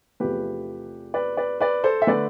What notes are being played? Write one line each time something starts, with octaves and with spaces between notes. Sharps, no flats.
E2 C3 F3 A3 G4 B4
B4 D5
B4 D5
B4 D5
A4 C5
E5
D3 A3 B4 D5